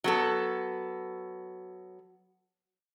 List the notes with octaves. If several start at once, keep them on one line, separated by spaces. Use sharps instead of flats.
F#3 B3 A4